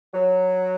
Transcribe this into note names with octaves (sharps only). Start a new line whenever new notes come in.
F#3